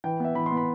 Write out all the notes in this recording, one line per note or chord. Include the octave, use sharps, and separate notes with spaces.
E3 G5
B3 E5
E3 B5
B3 C6
B5